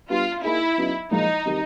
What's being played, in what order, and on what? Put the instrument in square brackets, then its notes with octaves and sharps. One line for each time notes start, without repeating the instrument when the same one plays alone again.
[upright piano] G3 B3 D4 [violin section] F4
[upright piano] A#3 D#4 G#4 [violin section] E4
[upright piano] C#3 F#3 B3 D#4
[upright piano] A#2 F3 G#3 [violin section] D#4
[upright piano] C3 D#3 G3